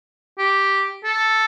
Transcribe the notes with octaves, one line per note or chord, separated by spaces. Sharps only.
G4
A4